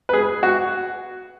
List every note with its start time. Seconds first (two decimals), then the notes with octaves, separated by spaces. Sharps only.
0.09 B4
0.13 G#4
0.43 F#4